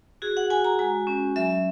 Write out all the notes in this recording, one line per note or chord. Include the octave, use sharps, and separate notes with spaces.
F#4 G#4
F#5
F#4 G#5
A#5
G#3 G#5
C#4
F#3 E5